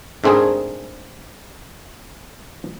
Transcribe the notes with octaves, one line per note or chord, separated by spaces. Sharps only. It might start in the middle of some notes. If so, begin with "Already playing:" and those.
G#2 A3 C4 D4 G#4 A#4